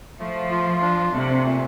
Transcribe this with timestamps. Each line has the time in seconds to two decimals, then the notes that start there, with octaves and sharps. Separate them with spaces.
0.20 F3 A3
0.51 F4
0.81 D4
1.12 C3 A3
1.44 A#2